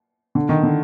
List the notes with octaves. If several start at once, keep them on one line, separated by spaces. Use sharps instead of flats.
D3
D#3
D3